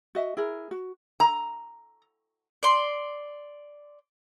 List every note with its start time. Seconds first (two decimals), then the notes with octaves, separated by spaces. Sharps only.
0.15 F#4 D#5 E5
0.37 E4 G#4 A#4
0.71 F#4
1.20 A#5
2.63 D5 C6